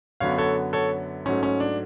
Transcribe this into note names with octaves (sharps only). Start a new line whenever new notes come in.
F#2 D3 F#3 B3 C#5 F5
A4 C#5
A4 C#5
G#2 F#3 A3 C#4
C#4
D4